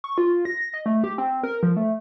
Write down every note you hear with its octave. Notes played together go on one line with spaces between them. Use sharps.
C#6
F4
A#6
D#5
A3
G4
C4
A#4
F3
A3